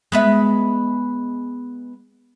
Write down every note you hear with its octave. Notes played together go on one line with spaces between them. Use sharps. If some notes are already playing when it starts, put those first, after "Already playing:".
G#3 B3 E5